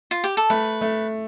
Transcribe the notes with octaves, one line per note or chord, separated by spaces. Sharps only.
F4
G4
A4
A3 B4
A3